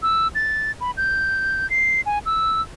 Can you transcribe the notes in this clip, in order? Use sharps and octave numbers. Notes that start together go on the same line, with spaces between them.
E6
A6
B5
G6
C7
G#5
E6